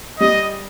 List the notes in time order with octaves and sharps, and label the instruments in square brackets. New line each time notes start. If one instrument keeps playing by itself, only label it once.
[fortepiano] G3 [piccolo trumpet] D#5